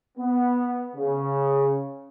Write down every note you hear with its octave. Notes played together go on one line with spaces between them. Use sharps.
B3
C#3